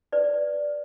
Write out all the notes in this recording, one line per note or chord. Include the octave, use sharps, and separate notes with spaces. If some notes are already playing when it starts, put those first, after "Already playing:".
B4 D5